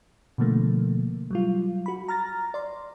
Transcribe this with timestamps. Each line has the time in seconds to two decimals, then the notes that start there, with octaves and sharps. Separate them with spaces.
0.38 B2 D3 F3 A3 A#3
1.31 F#3 G3 F4
1.86 F#4 B5
2.08 A#5 F6 A6 A#6
2.54 D5 C6